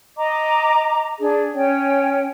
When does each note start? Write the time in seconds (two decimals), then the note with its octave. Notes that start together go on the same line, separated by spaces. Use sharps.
0.16 D#5 A#5 D6
1.18 D4 G#4
1.54 C#4 C#5 G5